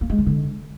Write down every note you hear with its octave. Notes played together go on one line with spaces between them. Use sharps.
A#3
G#3
D#3
D3